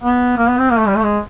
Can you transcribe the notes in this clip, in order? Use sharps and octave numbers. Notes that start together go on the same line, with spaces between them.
B3
A#3
B3
C4
A#3
A3
G3
A3
G#3